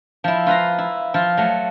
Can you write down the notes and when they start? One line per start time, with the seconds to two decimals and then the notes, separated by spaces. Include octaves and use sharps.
0.24 F3 E4
0.46 F4 B4 F5 A#5
0.78 E4
1.14 F3 F4
1.37 F#3 A3